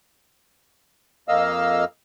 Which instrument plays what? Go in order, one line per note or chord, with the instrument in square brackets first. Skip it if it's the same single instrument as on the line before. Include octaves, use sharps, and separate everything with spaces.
[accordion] F2 A#3 D#5 F5 E6